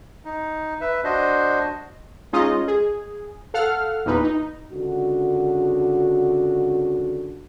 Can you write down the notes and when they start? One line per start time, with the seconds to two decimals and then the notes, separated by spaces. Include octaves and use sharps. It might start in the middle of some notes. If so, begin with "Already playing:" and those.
0.25 D#4
0.81 B4 E5
1.04 D4 F#4 C5 D#5
2.33 G#3 C#4 D#4 F4 D#5
2.68 G#4
3.54 A4 F5 F#5 F6
4.06 E2 A#2 D#4 B4
4.24 D#4
4.72 C#2 D3 F#4